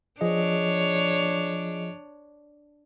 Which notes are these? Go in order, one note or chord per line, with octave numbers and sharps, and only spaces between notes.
F3 D4 G#4 C#5 D#5